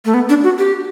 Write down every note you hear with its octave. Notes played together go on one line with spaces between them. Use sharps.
A3
B3
D4
F#4
G4